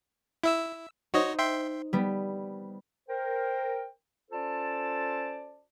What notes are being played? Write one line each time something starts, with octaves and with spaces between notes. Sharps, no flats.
E4 E5 E6
D#4 F#4 C5 C#5 D#5
E5 G5 C6
G3 B3
A#4 C5 G5
C#4 F4 A4 C5 D5 A5